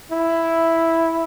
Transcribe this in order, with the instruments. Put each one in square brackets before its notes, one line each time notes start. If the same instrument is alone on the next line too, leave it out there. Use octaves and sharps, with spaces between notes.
[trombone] E4